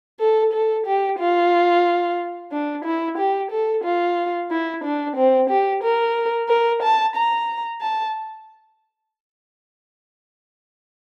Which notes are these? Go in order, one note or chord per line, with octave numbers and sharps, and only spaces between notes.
A4
A4
G4
F4
D4
E4
G4
A4
F4
E4
D4
C4
G4
A#4
A#4
A5
A#5
A5